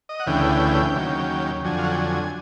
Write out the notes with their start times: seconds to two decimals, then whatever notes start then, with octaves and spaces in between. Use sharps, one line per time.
0.09 D#5
0.20 F#5
0.26 D2 C#3 E3 G5
0.96 D#2 C#3 F#3
1.64 F2 D3 F#3 G#5
1.79 F5
1.85 F#5
1.92 G5
1.99 G#5